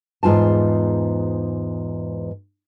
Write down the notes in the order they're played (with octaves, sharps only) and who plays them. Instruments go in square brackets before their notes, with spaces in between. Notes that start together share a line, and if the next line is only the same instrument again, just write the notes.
[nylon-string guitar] E2 G#2 F4 G#5 A5